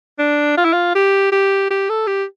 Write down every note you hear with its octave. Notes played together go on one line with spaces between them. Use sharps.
D4
F4
E4
F4
G4
G4
G4
A4
G4